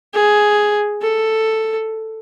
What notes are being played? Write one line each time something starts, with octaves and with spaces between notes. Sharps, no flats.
G#4
A4